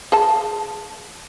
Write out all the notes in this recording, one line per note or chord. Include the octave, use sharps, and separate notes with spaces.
G#4 D#5 A5